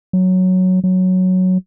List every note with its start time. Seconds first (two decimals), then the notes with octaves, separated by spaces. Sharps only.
0.13 F#3
0.84 F#3